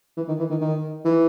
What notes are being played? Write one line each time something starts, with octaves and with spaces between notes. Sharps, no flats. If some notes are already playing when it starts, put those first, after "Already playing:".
E3
D#3
E3
D#3
D#3
E3